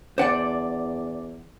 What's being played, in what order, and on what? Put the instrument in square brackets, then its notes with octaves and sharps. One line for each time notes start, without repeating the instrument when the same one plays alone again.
[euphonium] E2 [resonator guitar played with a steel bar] D4 D5 [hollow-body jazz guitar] C5 F#5